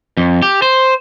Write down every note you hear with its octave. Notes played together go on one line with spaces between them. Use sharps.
F2
G4
C5